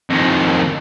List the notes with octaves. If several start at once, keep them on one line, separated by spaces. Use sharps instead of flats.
F2 D#3